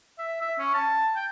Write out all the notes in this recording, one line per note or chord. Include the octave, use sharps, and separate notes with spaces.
E5
E5
C#4
A5
G5